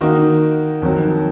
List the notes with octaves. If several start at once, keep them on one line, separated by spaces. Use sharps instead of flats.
D#3 A#3 D#4 F#4
F2 D#3 F#3